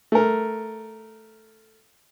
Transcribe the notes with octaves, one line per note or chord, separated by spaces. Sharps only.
A3 A#4